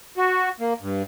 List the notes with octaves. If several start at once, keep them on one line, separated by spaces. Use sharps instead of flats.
F#4
A#3
G2